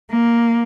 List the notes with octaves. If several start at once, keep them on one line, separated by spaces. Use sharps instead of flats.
A#3